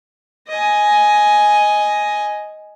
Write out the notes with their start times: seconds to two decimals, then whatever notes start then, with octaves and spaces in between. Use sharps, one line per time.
0.48 D#5 G#5